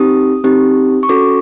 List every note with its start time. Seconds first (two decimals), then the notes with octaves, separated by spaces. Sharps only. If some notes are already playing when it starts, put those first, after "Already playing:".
Already playing: C4 D#4 G4 D#6
0.44 C4 D#4 G4
1.03 C#6
1.09 C#4 F#4 A4 D6